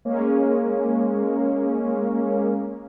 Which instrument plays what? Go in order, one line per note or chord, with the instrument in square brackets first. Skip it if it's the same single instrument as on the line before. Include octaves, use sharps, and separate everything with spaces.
[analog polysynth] G#3 A#3 C#4